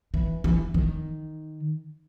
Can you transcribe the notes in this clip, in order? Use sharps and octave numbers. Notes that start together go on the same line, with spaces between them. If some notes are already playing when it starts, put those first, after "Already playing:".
E3
E3
D#3